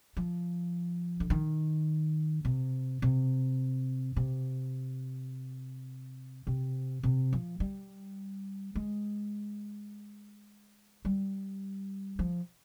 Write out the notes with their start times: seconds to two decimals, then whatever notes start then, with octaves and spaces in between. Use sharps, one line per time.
0.17 F3
1.20 D3
1.30 D#3
2.45 C3
3.02 C3
4.16 C3
6.47 C3
7.03 C3
7.33 F3
7.60 G3
8.75 G#3
11.05 G3
12.19 F3